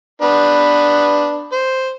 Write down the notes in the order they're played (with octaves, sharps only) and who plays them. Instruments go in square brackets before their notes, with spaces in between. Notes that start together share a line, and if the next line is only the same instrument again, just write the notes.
[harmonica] B3 D4 B4
C5